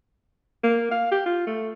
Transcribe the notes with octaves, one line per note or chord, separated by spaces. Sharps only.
A#3
F5
G4
F4
A3